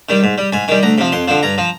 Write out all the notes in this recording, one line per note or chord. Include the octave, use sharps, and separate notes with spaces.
D#3 G3
G#2
G3
G#2 G#5
D#3 G3
D2 A#5
C3 F3
F2 C6
D3 F3
G2 A#5
F3